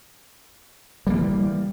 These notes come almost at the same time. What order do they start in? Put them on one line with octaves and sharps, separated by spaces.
G3 A#3 E3